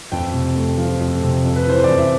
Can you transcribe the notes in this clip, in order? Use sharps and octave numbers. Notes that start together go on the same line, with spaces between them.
F2 G5
C3
A3
F3
F2
C3
F2
B4
E3 C5
D5
F2
E5